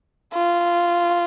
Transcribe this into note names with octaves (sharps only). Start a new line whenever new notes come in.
F4